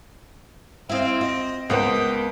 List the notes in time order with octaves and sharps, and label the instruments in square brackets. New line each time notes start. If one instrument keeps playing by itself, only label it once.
[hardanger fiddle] C4 [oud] E4 D#5 [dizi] F5
[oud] F4 [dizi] D#5
[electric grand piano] C#2 B4 [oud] A#3 B3 C5 [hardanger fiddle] G5 [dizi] D#6